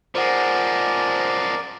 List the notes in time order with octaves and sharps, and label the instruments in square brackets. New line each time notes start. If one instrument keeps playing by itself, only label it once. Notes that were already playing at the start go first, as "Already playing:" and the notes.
[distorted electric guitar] F3 G#3 [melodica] A#4 D5 [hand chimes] C5 F#5